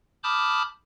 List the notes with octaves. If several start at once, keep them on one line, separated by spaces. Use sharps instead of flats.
A5 B5 D6 D#6 F6 G6